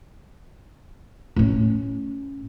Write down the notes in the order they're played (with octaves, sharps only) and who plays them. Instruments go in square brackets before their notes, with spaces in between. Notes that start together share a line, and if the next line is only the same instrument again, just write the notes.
[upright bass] A2 C#4